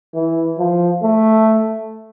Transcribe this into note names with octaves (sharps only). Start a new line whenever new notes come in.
E3
F3
A3